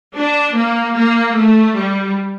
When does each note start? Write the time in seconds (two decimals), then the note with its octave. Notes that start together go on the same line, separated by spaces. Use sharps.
0.16 D4
0.56 A#3
0.96 A#3
1.35 A3
1.75 G3